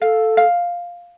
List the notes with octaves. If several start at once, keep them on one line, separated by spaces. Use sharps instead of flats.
A4 F5
F5